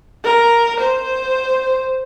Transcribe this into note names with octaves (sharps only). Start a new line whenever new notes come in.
A#4
C5